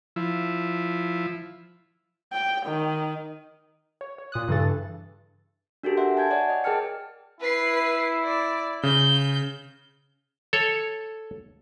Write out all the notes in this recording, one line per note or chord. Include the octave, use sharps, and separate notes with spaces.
F3 E4
G5
D#3
C#5
C#5
A#2 D#6 F#6
G2 C#3 E3 A4 A6
D4 F#4 G4 A4 A#4
E5 F#5 C6
G#5 A5 G6 G#6
C#5 D5 F#5 G#5
D#5
G#4 A#4 G5 A5 F6 C#7
E4 B4 C7
D5
C#3 G6
A4 C#5